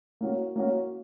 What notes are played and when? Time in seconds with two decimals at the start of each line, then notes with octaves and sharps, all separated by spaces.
0.21 A#3 C#4 F#4
0.56 A#3 C#4 F#4